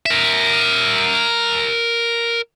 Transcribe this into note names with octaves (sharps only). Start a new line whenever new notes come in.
A#4 E5